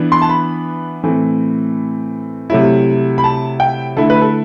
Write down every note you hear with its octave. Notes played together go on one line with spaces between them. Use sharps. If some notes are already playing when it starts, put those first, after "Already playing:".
Already playing: E3 B3 D4
C6
A5
B5
A2 E3 A3 C4
C3 F#3 A3 E4
B5
A5
G5
D3 A3 E4 A4
B4
A4